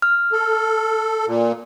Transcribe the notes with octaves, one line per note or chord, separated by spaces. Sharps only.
F6
A4
A#2